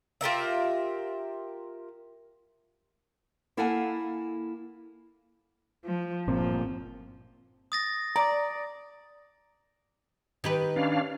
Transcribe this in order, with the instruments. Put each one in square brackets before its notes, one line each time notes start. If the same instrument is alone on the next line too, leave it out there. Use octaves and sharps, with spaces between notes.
[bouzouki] F4 G4 A#4 E5
[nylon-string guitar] A#3 E4 A4 F5 F#5 G#5
[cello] F3
[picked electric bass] G1 A#2 C4 [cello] F3
[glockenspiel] D#6 A6 A#6
[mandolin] D5 [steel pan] A#5
[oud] D#3 G4 B4
[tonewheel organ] C#4 D4 F5